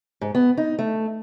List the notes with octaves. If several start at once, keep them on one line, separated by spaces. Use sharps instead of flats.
G#2
B3
D#4
A3